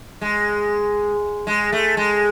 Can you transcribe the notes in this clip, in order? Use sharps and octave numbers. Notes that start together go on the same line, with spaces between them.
G#3
G#3
A3
G#3